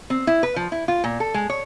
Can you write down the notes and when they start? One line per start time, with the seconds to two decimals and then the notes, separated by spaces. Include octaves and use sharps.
0.10 C4
0.27 E4
0.43 B4
0.56 F3
0.72 E4
0.88 F4
1.04 A#2
1.20 A4
1.34 G#3
1.50 C#5